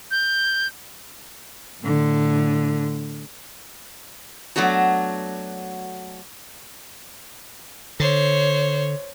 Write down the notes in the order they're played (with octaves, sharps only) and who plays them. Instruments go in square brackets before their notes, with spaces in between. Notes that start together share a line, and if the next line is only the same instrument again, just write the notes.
[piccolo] G6
[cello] A2 D3
[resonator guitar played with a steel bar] F#3 A3 B3 D4 F#4
[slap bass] D3 [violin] C5 C#5